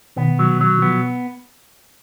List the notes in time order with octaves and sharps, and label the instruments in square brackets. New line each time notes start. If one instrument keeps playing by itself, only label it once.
[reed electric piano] B2 D#3 [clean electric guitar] B3
[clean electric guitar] F#3
F#3
[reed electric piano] F3 [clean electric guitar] B3